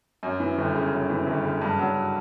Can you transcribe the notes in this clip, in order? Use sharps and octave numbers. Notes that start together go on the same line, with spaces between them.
F#2
E3
G1
C#3
F#2
E3
G1
C#3
G2
F#3